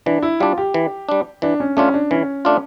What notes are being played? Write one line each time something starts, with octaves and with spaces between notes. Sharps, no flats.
E3 D4
E4
G3 D4 F4
G4
E3
G3 D4
E3 D4
C#4
A3 C#4 D4 F4
D4
E3 C#4
A3 D4 F4